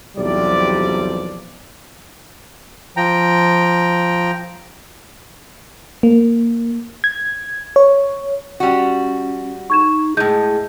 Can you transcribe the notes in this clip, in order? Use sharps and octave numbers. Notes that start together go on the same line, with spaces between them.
B1 E2 C3 F3 G3 D5
F3 G5 A#5
A#3
G#6
C#5
G3 C#4 F#4
D#4 C#6 G#6 E7
A2 G#3 G#4 G6